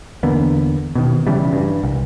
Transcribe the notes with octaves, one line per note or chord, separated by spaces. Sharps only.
E2 D3 A#3 B3
B2 D#3
C#3 E3 G3
G2
C2